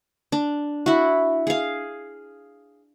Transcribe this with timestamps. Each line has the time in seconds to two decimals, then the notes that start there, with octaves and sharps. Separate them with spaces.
0.32 D4
0.86 E4 F#4
1.47 G#4 F5